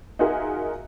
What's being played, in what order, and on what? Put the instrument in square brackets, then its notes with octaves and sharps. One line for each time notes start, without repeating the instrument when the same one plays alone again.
[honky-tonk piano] D#4 F4 F#4 G#4 A#4 E5